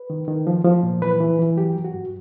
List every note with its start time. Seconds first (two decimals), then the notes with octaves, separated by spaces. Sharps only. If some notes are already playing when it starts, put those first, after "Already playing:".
Already playing: B4
0.10 D#3
0.28 D#3
0.47 F3
0.64 F3
0.83 A#2
1.02 E3 B4
1.20 E3
1.39 E3
1.57 F#3 G4
1.75 F#3
1.85 F#4
1.94 G2